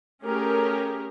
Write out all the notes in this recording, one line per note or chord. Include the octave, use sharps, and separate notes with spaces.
A3 C#4 G4 G#4 A#4